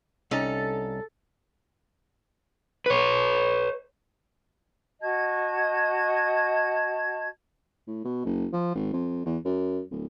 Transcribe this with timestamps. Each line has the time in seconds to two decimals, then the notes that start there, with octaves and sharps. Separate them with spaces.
0.31 C2 C#4 D#4 A4
2.86 B4 C#5
5.01 F#4 D#5 A5 G#6
7.87 A2
8.05 B2
8.25 F#1
8.53 F3
8.75 G#1
8.93 F2
9.25 E2
9.45 F#2
9.91 D1